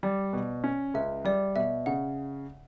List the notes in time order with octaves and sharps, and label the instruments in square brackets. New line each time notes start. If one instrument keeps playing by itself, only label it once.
[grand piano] G3 [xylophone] D5
[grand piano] B2
C#4
[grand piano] C#2 [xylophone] E5
[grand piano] G3 [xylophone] D5
[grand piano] B2 [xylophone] E5
[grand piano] C#3 [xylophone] F#5